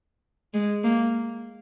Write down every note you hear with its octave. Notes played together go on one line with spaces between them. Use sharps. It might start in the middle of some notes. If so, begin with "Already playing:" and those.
G#3
A#3